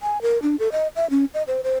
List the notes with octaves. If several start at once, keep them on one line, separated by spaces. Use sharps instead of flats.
G#5
A#4
D4
A4
D#5
E5
C#4
D#5
C5
C5